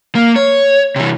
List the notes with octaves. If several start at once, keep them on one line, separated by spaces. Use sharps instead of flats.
A#3
C#5
C3 E3